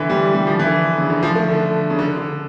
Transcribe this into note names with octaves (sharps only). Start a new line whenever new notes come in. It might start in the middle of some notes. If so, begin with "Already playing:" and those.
Already playing: D3 E3
G3
G3
F3
E3
D3
C#3
D3
F3
A3
D3
C#3
D3
D3